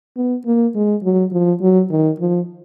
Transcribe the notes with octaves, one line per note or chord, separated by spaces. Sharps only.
B3
A#3
G#3
F#3
F3
F#3
D#3
F3